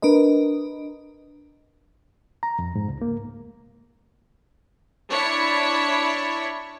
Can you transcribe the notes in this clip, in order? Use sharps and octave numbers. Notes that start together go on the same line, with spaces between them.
D4 A#4 B4 D#5
A#5
F2
G#2
C#2
A#3
D4 E4 C#5